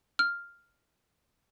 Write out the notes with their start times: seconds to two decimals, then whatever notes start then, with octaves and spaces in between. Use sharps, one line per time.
0.19 F6